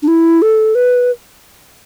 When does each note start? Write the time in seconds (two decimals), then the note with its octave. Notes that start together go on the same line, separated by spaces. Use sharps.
0.03 D4
0.08 E4
0.42 A4
0.75 B4